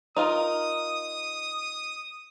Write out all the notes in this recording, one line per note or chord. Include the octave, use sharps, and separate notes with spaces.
D#4 F4 A#4 D#6